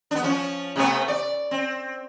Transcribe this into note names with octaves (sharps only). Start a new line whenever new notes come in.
B3 D4
F3 C#4
C3 A3 B3
D5
C4